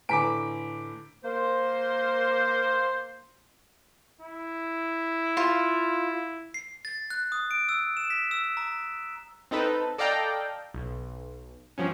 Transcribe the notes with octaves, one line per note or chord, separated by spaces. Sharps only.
A2 D3 B4 G#5 A#5 D6 B6 D7
A#3 C5
E4
F4
C7
A6
F#6
D#6
D7
E6
E7
B6
E6
A#5
C4 D#4 A4 B4
A4 D5 D#5 F5 G5 A#5
B1
G2 F3 F#3 C#4